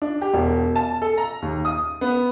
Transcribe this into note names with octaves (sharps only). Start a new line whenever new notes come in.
D4
G4
E1
A5
A4
A#5
D#2
D#6
B3